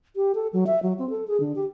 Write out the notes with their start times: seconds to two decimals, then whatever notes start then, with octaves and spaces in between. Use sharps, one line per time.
0.16 G4
0.35 A4
0.53 F#3
0.67 E5
0.83 F#3
0.99 C4
1.10 A4
1.28 G#4
1.40 D3
1.56 G4